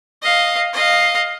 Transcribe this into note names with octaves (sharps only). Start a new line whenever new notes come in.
D#5 F5
D#5 F5